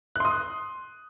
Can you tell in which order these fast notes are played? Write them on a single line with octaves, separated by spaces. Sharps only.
F#6 C6 D#6